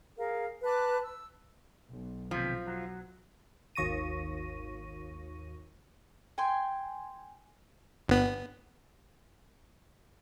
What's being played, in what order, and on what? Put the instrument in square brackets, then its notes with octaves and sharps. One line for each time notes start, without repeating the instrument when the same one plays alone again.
[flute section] G#4 A#4 F5
B4 A5 D6 F#6
E6
[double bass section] B1
[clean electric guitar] D#2 C3 [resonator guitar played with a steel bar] F3
[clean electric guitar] F#3
[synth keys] G#1 D#2 C#6 A#6 D#7
[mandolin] G5 G#5 C6
[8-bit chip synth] G1 B3